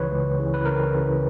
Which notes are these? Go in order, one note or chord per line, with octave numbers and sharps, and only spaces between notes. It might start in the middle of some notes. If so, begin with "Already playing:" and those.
Already playing: C#2 C#3 E3 B4 C#5
C#2
C#3 E3
B4
C#2 A#4
C#3 E3